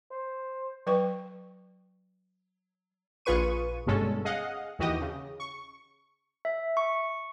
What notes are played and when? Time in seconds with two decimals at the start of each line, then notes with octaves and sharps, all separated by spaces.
0.11 C5
0.87 F#3 B4 G5 C#6
3.25 A#1 F4 G#4 B4 C#6 D#7
3.86 G1 G2 B2 G#3 C#4 A4
4.25 G#4 D#5 F5 F#5
4.79 D#2 E3 F#4 G4 D#5
5.01 C#3
5.40 C#6
6.45 E5
6.77 C#6